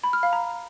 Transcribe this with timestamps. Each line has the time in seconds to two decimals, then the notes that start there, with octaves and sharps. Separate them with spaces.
0.04 B5
0.13 F6
0.23 F5
0.33 A#5